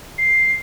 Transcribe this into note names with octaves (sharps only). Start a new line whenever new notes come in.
C7